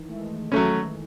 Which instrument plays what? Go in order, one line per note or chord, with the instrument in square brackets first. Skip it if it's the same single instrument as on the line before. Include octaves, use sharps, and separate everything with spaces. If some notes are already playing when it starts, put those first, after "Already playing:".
Already playing: [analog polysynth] D#3 E3
A3
G#3
[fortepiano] F#3 A3 C#4